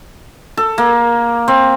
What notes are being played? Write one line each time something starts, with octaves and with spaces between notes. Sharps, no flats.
A4
A#3
C4